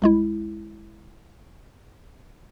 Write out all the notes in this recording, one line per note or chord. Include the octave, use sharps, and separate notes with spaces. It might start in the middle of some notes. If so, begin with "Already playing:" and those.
C2 G#3 E4